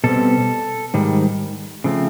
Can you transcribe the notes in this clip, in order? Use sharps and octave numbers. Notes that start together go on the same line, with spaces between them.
B2 G3 C4 A4
G#2 D#3 G3
C#3 F3 A3 C4